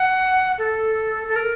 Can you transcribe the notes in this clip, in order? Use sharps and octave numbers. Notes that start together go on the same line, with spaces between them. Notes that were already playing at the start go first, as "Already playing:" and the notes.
Already playing: F#5
A4
A4
A#4